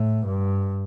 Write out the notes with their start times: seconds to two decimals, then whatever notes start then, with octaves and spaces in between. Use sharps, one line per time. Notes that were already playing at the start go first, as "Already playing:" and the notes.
Already playing: A2
0.26 G2